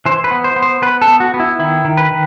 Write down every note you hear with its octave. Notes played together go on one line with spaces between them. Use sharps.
E3 C5
B4
B3
C5
B3
C5
B3 B4
A4
B3
F#4
B3
E4
D#3 E4
D#3
B4
D#3